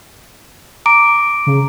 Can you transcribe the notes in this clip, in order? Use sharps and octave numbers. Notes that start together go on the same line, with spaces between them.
A#5 D6 D7
C#3